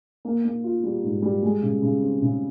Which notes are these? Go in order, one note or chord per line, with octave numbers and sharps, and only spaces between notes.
A#3
A#3
F4
G3
G#2
G3
G#3
C#3
C#3
C4
C#3